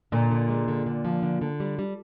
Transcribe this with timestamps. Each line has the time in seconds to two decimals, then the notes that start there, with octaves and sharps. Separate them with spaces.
0.12 A#2 D3
0.31 D3
0.49 G#3
0.68 D3
0.86 D3
1.05 F3
1.23 D3
1.41 D3
1.60 G3
1.79 G3